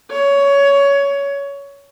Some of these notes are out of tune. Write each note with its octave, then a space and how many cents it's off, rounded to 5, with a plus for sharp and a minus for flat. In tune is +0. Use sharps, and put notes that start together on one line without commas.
C#5 +15